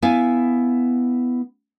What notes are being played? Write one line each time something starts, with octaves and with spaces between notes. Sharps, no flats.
B3 E4 F5 G#5